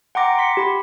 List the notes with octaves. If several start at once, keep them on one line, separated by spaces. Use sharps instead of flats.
F#5 G5 A#5 C6 D6 A#6
C6 B6 C#7
G4 B5